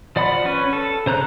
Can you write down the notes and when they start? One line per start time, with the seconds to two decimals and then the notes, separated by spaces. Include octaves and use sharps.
0.16 F3 D5 F#5 B5
0.45 C#4 B4
0.73 A4
1.06 C#3 C5 A#5 F#6